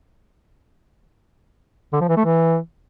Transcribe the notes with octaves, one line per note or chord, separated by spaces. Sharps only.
D3
F3
E3
A3
E3